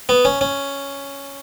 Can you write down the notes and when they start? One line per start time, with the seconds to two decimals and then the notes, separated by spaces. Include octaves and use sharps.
0.09 B3
0.25 C#4
0.41 C#4